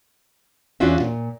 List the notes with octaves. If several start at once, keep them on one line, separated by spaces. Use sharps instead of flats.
E2 C#4 D4 F4 F#4 E5
A#2